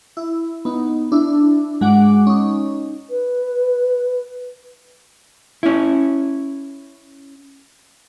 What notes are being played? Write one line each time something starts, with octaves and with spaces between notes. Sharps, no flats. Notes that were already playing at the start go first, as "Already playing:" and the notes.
E4
B3 D#4
D4 E4
G#2 G#3 F#4 F#5 D6
C#4 D#4
B4
C#4 E4